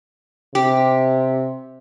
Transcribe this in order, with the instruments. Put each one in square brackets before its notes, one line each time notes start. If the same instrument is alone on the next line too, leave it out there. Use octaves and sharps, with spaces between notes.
[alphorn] C3 [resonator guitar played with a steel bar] G4